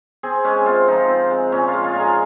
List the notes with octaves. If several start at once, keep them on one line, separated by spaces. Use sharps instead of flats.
C4 G#4
G#3 C#4
C3 F4
F3 D#4
C4
G#3
A#2 C#4
G#3 F4
F4
A#2 A#4
G#4